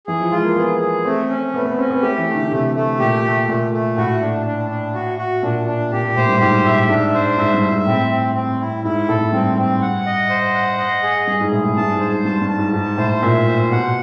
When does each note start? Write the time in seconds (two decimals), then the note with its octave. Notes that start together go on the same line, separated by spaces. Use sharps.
0.07 E3 G#4
0.20 F3
0.31 G#3 F4
0.44 A#3
0.56 B3 G#4
0.80 G#4
1.05 A3 C4
1.29 C#4
1.54 A3 B3
1.65 B3
1.78 C4 C#4
1.91 B3
2.02 A3 G4
2.18 E3
2.27 A3
2.35 D3
2.51 C3 A3
2.75 A3
2.99 A#2 G4
3.25 A3
3.48 A#2 A3
3.72 A3
3.97 A2 F#4
4.22 D4
4.46 D4
4.70 D4
4.95 F#4
5.18 F#4
5.43 A#2 D4
5.67 D4
5.92 A#2 G4
6.04 A#2
6.16 A2 C5
6.28 G2
6.40 G#2 G4
6.65 A2 E5
6.89 G#2 D4
7.14 C5
7.38 G#2 E5
7.54 G2
7.62 E5
7.71 G#2
7.86 A2 C4
8.10 C4
8.35 C4
8.60 E4
8.84 G#2 E4
9.09 A2 A4
9.21 G#2
9.32 G2 C4
9.58 C4
9.82 F#5
10.06 D#5
10.30 C5
10.55 F#5
10.78 D#5
11.03 G#4
11.27 G2 G#4
11.40 G#2
11.51 A2 G#4
11.64 A2
11.77 G2 A5
11.92 G#2
12.00 C5
12.08 G#2
12.25 G2 A5
12.41 G2
12.49 A5
12.58 G#2
12.73 G#2 A5
12.98 A2 C5
13.22 A#2 E5
13.47 C5
13.71 B2 F#5